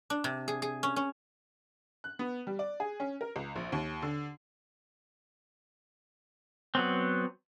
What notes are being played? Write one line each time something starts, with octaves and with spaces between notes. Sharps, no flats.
D4
C3
G#4
G#4
C#4
C#4
F#6
B3
G3
D5
G#4
C#4
A#4
C#2
A#1
D#2
D3
F#3 B3 C4